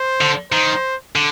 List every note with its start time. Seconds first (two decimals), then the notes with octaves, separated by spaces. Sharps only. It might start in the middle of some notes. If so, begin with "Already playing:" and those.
Already playing: C5
0.21 D3
0.52 D#3 C5
1.15 D3